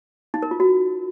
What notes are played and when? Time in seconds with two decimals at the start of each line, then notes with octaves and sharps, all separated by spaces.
0.34 D#4
0.43 A#4
0.51 F4
0.60 F#4